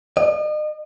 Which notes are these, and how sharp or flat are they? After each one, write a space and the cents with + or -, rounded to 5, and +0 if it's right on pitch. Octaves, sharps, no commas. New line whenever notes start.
D#5 -40